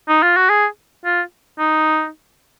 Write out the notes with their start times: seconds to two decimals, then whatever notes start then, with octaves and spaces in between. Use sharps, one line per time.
0.08 D#4
0.23 F4
0.36 F#4
0.50 G#4
1.04 F4
1.59 D#4